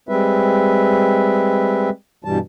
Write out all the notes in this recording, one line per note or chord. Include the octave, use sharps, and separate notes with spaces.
G3 G#3 C4 B4 E5
G2 B2 E3 G3 A5